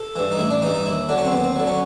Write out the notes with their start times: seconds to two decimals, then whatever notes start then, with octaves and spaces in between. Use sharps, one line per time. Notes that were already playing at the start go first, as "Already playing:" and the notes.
Already playing: A4
0.16 G2 E3
0.32 D#4
0.39 A1 E4
0.50 D4
0.62 G2 E3 D#4
0.74 D#4
0.86 D#2 E4
1.09 D3 F#3 D4
1.18 C#4
1.25 C4
1.32 D#2 B3
1.44 C4
1.56 D3 F#3
1.67 C#4